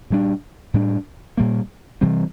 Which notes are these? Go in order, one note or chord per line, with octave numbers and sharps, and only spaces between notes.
A#2 G3 D4
A2 G3 D4
A#2 G3 A#3
C3 E3 G3 C4